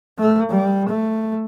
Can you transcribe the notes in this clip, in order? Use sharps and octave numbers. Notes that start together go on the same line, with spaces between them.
A3
G3
A3